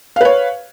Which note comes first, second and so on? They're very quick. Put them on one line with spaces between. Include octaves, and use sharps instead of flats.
F5 B4 C#5